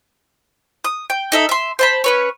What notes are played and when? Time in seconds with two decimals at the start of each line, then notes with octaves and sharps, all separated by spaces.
0.84 D#6
1.10 G5
1.32 D#4 A4 E5
1.49 E5 C6
1.79 C5 A5 B5
2.04 C#4 B4 C#5